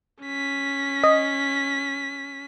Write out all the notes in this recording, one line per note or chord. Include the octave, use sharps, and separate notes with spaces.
C#4 B6
D#5